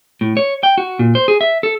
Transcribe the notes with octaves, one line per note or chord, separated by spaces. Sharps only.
A2
C#5
G5
F#4
A#2
C5
G#4
E5
A4